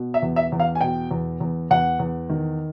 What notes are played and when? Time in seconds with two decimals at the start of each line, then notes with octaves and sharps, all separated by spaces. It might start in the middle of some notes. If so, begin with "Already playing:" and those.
Already playing: B2
0.14 E5
0.22 E2
0.36 E5
0.52 E2
0.60 F5
0.75 G#5
0.81 B2 G5
1.11 E2
1.40 E2
1.71 E2 F#5
1.99 E2
2.29 D#3